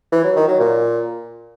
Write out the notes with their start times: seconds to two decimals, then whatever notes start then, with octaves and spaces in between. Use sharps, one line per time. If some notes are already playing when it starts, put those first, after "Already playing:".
0.12 E3
0.24 F#3
0.36 D#3
0.48 F#3
0.60 A#2